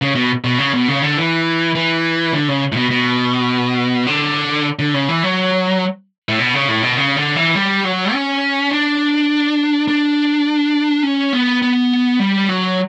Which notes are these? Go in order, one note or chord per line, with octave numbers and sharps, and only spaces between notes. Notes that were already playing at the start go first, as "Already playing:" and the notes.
C#3
B2
B2
C#3
B2
C#3
D3
E3
E3
D3
C#3
A2
B2
B2
D3
D3
C#3
E3
F#3
A2
B2
C#3
A2
B2
C#3
D3
E3
G3
F#3
C#4
D4
D4
C#4
B3
B3
G3
F#3